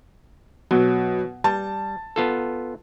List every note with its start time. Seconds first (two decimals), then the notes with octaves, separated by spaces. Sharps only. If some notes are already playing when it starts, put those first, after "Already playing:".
0.71 B2 F#3
1.44 G3 A5
2.16 B3 F4 A4